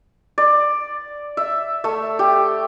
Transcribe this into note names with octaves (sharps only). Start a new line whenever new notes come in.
D5
E5
A3
G4